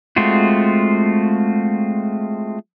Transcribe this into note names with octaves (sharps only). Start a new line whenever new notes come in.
G#3 A3 C4 F4 F#4